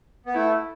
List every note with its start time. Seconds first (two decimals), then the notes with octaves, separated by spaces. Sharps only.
0.26 B3
0.34 A3 E4